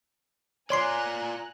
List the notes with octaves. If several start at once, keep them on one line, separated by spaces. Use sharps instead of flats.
F4 C#5 D5 G#5 A#5 C6 F#6 C7